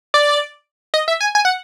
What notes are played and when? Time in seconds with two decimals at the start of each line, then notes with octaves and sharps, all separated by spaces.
0.14 D5
0.94 D#5
1.08 E5
1.21 G#5
1.35 G#5
1.45 F#5